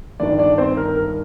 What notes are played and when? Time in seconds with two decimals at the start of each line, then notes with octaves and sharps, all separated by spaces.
0.20 G1 G2 D#3 D4 D5
0.39 D4 D5
0.58 C4 C5
0.77 A#4
0.96 A#4